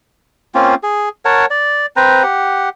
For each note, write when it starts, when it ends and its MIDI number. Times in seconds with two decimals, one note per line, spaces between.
0.55 0.75 58
0.55 0.75 60
0.55 0.75 61
0.55 0.75 65
0.83 1.09 68
1.25 1.46 70
1.25 1.46 73
1.25 1.46 78
1.25 1.46 81
1.50 1.86 74
1.96 2.23 60
1.96 2.23 71
1.96 2.23 72
1.96 2.23 82
2.23 2.69 67
2.23 2.69 78